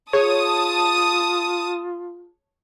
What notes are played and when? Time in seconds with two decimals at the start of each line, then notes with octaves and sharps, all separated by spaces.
0.13 F4 G#4 C#5 A5 D#6